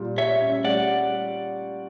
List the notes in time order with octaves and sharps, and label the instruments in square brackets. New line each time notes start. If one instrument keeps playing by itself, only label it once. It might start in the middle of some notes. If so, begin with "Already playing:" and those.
Already playing: [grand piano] A#2 G3
[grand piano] G4 [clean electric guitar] C#5 E5
[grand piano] C#4
[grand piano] G3 [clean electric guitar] D5 F#5